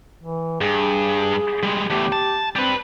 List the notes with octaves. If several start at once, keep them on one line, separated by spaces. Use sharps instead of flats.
E3
G2 G#4
G3 G#3
E2 A3 G4
A5
G3 C4 B4